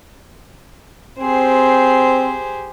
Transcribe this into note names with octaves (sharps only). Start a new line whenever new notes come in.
C4 G4 G#4 C5